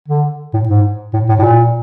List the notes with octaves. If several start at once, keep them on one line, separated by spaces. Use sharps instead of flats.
D3
A2
G#2
A2
A2
A2
A#2